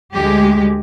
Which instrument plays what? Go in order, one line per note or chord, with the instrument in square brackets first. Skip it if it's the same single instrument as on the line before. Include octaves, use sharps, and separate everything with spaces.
[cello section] D2 G#3 G4